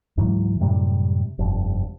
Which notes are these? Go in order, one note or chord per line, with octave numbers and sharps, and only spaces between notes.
C#2 G#2 E3 F#3
F#2 A2 C3 G3
F1 G2